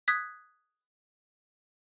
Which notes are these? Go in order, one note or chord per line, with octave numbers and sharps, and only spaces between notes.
D#6 F#6 G#6 B6